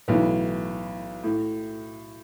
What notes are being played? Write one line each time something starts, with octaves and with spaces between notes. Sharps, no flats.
B1 A2 E3 B3
A2